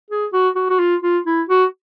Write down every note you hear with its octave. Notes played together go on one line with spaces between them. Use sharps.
G#4
F#4
F#4
F#4
F4
F4
E4
F#4